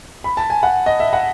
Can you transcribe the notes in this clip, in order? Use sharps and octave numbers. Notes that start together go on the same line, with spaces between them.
B5
A5
G#5
F#5
D#5
E5
F#5